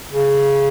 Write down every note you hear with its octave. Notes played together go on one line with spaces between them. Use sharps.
C#3